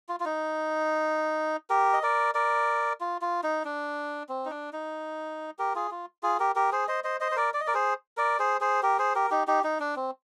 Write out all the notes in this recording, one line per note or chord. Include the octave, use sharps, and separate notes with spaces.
F4
F4
D#4
G4 A#4
D#5
A#4 D5
A#4 D5
F4
F4
D#4
D4
C4
D#4
D4
D#4
G4 A#4
F4 G#4
F4
F4 G#4
G4 A#4
G4 A#4
G#4 C5
C5 D#5
C5 D#5
C5 D#5
C5
A#4 D5
D5
D#5
A#4 D5
G#4 C5
A#4 D5
G#4 C5
G#4 C5
G4 A#4
G#4 C5
G4 A#4
D#4 G4
D#4 G4
D#4
D4
C4